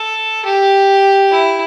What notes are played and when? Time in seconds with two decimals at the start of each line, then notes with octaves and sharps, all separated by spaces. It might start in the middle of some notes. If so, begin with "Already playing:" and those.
Already playing: A4
0.45 G4
1.31 E4